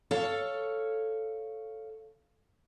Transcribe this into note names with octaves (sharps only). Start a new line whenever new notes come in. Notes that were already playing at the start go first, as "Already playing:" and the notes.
A4 C#5 F5